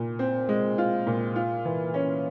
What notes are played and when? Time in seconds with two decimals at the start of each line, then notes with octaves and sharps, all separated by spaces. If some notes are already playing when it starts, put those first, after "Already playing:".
Already playing: A#2
0.19 C4
0.49 G#3
0.78 F4
1.07 A#2
1.36 F4
1.65 E3
1.94 C#4